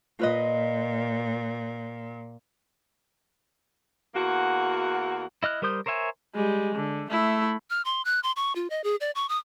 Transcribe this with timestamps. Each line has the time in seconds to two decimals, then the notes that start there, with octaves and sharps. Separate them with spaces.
0.19 A#2 F4 B4 D#5
4.15 E2 A#3 F#4
5.43 E4 D#5 F6 F#6
5.62 G3 A#4 C5 D#6 G6
5.86 A#4 C5 C#5 E5 G#5
6.35 G3 G#3
6.76 D3
7.10 A3 E4
7.70 F6
7.85 C6
8.05 F#6
8.23 C6
8.36 C#6
8.56 F4
8.70 D#5
8.84 G#4
9.01 D5
9.15 C#6
9.29 D#6